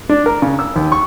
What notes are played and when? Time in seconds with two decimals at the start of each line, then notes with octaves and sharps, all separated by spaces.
0.09 D4
0.26 A#4
0.42 C#3
0.59 E6
0.76 D#2
0.92 C#6